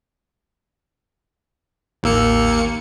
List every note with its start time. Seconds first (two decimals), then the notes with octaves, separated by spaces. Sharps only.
2.03 A1 D#2 A#3 E6 C#7